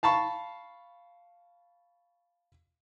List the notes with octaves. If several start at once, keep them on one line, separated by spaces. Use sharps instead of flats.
F5 A5 B5 C#6